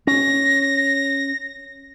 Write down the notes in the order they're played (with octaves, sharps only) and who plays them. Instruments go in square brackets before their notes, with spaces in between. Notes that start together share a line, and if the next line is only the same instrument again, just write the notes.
[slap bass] C#4 [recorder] A#6